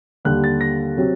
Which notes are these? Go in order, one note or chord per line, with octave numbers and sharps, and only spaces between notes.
D#2 D3 G3 F#6
A6
A#6
C3 F#3